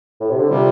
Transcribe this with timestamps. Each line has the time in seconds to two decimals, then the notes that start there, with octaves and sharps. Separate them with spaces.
0.20 A2
0.30 C3
0.40 D3
0.50 C3 F3 G3